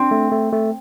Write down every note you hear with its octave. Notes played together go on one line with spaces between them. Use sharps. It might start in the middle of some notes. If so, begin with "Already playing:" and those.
Already playing: C4 D4
A3
A3
A3